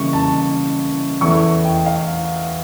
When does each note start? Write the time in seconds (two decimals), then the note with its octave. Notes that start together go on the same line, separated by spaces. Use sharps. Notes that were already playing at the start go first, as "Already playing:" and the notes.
Already playing: C#3 E3 G3 A#3 C#6
0.13 A5
1.21 E2 E3 A3 E4 C#6
1.64 G5
1.86 F5